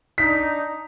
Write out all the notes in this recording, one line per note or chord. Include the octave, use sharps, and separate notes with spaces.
D4 D#4 B6